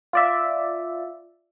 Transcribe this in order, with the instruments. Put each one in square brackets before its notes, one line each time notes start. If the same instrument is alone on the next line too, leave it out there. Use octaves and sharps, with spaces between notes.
[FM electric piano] F4 D5 E5